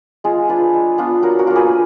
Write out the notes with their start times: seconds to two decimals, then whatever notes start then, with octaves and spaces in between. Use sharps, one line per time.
0.24 G#3 F4 G#4
0.49 D4 F4 G#4 B4
0.74 G#3
0.98 B3 D4 F4
1.22 F#3 F#4 A#4
1.39 F#4 A#4
1.47 A#3 F4
1.56 G#4 B4